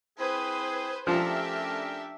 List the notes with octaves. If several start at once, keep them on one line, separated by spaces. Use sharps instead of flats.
C4 E4 G#4 B4 C5
F3 A3 C#4 D4 G4 A#4 E5